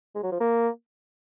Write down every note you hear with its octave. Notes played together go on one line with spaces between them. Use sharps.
G#3
F#3
F3
A#3